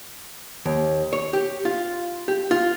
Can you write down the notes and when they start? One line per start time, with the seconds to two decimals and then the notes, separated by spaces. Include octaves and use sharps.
0.66 D#2
1.13 C#5
1.33 G4
1.65 F4
2.28 G4
2.51 F4